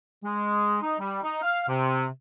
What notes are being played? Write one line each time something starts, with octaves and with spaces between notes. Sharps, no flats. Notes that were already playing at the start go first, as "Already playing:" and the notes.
G#3
D#4
G3
D#4
F5
C3